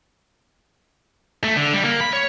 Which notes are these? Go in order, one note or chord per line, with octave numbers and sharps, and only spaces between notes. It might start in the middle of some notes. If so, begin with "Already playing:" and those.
A3
D3
G3
A#3
B5
C#5